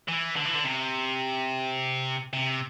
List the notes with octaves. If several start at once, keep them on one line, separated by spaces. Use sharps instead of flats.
E3
D3
E3
D3
C3
C3